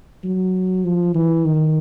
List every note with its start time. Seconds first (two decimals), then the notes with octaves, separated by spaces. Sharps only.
0.24 F#3
0.84 F3
1.15 E3
1.45 D#3